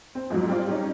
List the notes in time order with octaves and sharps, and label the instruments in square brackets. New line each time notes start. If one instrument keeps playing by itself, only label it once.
[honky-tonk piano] C4
F2 G#2 F3 F#3
G3 C4 F4 D5
G3 C#4 D#4